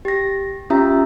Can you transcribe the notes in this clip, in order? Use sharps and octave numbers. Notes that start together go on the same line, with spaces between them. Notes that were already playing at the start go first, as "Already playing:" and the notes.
G4 A#6
C#4 F4 G4 E5 A#5